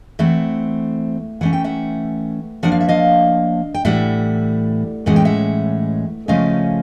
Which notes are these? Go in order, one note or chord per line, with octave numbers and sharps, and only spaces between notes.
E3 A3 C4 E5 F#5
E3 A3 C#4 F#5
G5
E5 F#5
F3 A#3 D4 F#5
F5
E5
D#5 F5
G5
A2 E3 G3 E5 F#5
A2 E3 G#3 C#4 F#5
G5
E5 F#5
C#3 F3 A3 C#4 D#5 F5